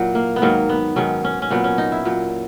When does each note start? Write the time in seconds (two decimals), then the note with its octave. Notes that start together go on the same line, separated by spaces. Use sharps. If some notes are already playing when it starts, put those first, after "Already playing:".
Already playing: A#2 F#3 E4 F#4
0.15 A#3
0.36 B3
0.42 G#2 D#3 F#3 A#3
0.69 B3
0.96 G#2 D#3 F#3 C#4
1.24 C#4
1.42 C#4
1.50 A#2 F#3 B3
1.64 C#4
1.78 D#4
1.92 E4
2.05 A#2 F#3